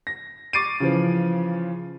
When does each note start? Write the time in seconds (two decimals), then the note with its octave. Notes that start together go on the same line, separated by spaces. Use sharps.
0.07 A#6
0.53 C#6 D6 A6 C7 D7 D#7
0.80 C#3 E3 F3